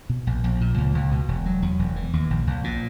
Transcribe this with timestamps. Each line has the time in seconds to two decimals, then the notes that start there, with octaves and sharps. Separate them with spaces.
0.09 B2
0.27 A#1
0.44 A#1
0.61 A#2
0.78 C#2
0.95 C#2
1.12 B2
1.28 E1
1.46 F#3
1.62 E2
1.79 E1
1.96 E3
2.13 D#2
2.30 A#1
2.47 A#1
2.64 A#2